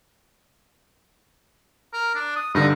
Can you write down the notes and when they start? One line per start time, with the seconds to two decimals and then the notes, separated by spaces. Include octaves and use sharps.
1.93 A#4
2.15 D4
2.36 D#6
2.55 G2 D3 D#4